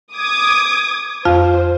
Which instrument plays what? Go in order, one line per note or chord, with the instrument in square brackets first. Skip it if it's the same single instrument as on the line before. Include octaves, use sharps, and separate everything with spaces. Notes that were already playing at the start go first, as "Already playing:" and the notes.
[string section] D6 D#6 G#6
[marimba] F2 F4 F5 [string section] C5